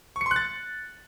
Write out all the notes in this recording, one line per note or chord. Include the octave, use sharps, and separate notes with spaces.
C#6
C#7
C6
F#6
A6